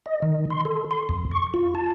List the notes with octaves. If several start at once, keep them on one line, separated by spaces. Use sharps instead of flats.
D#5
D#3
C6
A4
C6
F2
C#6
F4
A5